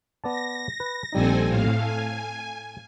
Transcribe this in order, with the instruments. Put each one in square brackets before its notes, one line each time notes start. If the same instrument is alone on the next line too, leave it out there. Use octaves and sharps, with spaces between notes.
[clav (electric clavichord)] B3 D5 A5 [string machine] A#6
[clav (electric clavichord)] B4
[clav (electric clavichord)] A#1 G3 D#4 [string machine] C4 A4 G#5
[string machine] A2 F5
[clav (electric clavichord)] A4 [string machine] G#5